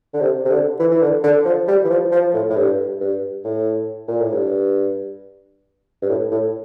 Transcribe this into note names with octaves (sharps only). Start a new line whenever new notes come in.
D3
C3
C3
D3
E3
E3
D3
D3
F3
G3
E3
F3
F3
A2
A2
G2
G2
A2
A#2
A2
G2
G2
A2
A2